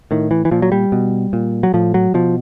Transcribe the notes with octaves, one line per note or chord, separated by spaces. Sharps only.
A2 D#3
E3
E3
A#2 F3
F#3
G3
B2
A#2
F#3
A2 F3
F#3
B2 F3